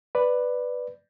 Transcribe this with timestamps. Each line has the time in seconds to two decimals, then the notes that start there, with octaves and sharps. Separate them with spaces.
0.15 B4 D5